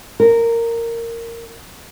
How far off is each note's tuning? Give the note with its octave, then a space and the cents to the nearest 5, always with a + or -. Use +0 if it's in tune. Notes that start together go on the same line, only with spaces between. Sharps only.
A#4 -15